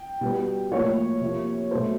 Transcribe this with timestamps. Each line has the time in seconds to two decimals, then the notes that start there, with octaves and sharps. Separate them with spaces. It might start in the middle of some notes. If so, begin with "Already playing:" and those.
Already playing: G5
0.21 B2 G3 B3
0.72 A2 F3 A#3 C#5
1.21 C3 F3 A#3
1.71 B2 F#3 A3 C5